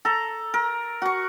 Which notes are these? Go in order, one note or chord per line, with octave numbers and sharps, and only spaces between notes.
A4 A#5
A#4
F#4 C#6